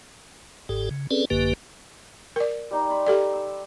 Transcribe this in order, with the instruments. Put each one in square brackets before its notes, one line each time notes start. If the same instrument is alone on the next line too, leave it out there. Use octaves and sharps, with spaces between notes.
[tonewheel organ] G1 G#2 G4 A4
C#3
C4 C#4 G#4 A4 B4 D5
G#1 F#2 D3 A#3 G4 B4
[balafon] A#4 D5
[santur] G3 D#4
B5 C6
[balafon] G4 A4 D5
[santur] E6